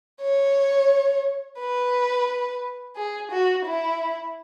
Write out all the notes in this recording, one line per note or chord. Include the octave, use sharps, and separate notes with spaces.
C#5
B4
G#4
F#4
E4